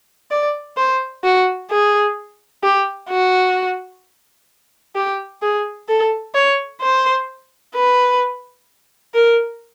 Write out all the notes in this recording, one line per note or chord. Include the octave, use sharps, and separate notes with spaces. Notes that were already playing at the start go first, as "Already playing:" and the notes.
D5
C5
F#4
G#4
G4
F#4
G4
G#4
A4
C#5
C5
B4
A#4